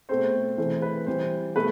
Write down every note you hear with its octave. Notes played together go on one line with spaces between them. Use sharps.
B2 A3 C4 C5
C3 E3 A3 C5
B4
E3 G3 C4 C5
B2 A3 B4